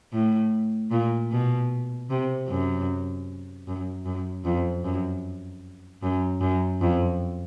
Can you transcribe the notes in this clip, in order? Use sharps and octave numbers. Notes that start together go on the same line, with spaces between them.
A2
A#2
B2
C3
F#2
F#2
F#2
F2
F#2
F#2
F#2
F2